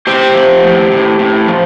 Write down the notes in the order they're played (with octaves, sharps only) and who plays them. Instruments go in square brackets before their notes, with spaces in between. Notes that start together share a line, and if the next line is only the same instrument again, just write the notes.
[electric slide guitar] A2 G4 C5
F3
A2
A2
A2
F3